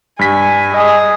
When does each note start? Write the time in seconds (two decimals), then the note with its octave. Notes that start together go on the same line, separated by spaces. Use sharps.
0.19 G2 G#5 B6
0.73 G#4 D#5 G#5